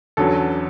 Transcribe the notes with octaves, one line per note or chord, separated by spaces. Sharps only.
E2 D3 F#3 C#4 A4